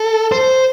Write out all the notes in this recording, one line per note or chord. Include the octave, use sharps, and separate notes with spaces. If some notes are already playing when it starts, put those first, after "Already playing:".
Already playing: A4
C5